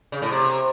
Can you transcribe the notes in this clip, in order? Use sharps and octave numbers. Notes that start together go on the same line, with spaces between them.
C#3
A2
C3